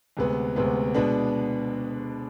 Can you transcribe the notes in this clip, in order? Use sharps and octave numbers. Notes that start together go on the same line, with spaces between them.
D2 C3 G#3 B3
D2 C3 G#3 B3
B2 G#3 B3 D4